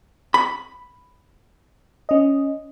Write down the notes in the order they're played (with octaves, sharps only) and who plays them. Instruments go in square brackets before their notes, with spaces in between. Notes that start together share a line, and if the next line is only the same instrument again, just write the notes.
[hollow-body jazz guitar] B5
[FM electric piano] C#4 D#5